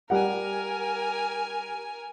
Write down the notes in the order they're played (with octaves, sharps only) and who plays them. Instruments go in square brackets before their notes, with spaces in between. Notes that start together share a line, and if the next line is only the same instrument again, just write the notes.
[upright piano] G3 F#5 [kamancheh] A#4 G#5